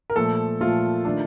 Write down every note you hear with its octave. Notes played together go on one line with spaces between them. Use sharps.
A#4
A#2 F3 A3 A4
A#2 F3 A3 F4
D#3 A3 D4